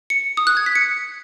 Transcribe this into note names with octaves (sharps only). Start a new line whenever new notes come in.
C#7
D#6
F#6
G#6
B6
C#7